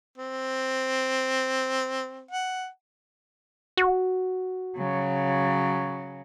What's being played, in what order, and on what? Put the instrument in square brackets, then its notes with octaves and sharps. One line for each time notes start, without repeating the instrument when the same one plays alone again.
[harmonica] C4
F#5
[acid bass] F#4
[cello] C#3 F#3